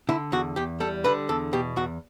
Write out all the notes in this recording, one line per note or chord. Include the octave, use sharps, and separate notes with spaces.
D3 E4
E2 F#4
E2 G4
G3 A4
D3 B4
E2 A4
B2 G4
E2 F#4